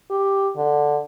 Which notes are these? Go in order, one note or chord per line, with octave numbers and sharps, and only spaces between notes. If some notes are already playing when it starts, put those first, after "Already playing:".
G4
D3